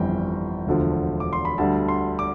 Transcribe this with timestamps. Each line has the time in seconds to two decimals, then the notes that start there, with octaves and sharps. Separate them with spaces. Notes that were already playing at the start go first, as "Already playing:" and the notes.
Already playing: G1 F2 E3 G3 G5
0.67 E1 D2 D3 F3
1.20 D6
1.33 C6
1.45 B5
1.58 D2 D3 G3 A5
1.88 C6
2.19 D6